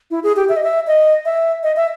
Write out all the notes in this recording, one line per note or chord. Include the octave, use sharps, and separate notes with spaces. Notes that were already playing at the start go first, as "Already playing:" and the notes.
E4
G#4
G4
E5
D#5
E5
D#5
E5
D#5
E5